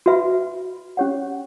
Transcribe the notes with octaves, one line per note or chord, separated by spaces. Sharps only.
F#4 B4 E5 B5
C#4 G4 C#5 F#5